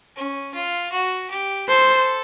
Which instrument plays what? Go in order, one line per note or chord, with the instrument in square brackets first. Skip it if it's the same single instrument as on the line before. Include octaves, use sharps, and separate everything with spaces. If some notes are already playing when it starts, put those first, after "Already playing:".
[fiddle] C#4
F4
F#4
G4
[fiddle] A4 [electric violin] C5